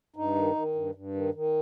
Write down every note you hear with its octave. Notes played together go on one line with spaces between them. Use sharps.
G2 D#4
D#3
D#3
G2
G2
D#3
D#3